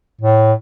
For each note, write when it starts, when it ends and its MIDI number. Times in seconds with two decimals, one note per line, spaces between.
0.21 0.53 45